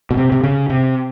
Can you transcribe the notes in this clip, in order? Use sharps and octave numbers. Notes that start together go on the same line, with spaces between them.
B2
C3
C3
C#3
C3